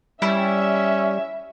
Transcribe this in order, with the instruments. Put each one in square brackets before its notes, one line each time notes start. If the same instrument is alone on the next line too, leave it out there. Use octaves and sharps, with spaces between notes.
[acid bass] G3 [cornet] C#4 [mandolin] E4 [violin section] E5